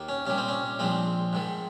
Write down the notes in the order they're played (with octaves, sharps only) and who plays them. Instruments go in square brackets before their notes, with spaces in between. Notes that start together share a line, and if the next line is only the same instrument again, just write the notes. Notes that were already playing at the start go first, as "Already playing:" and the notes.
Already playing: [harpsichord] D#2 D#3 A#3
C#4
C2 A#2 G3 C#4
C4
C#4
A#1 A#2 F3 G#3 C4
G#2 D#3 G#3